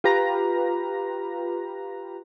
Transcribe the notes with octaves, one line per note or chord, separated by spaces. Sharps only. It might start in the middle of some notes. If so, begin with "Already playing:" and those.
F4 G4 B4 A#5